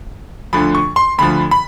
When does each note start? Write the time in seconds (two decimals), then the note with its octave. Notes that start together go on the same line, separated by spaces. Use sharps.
0.53 D2 D3 F3 B5
0.75 C#6
0.96 C6
1.18 D2 D3 F3 B5
1.51 B5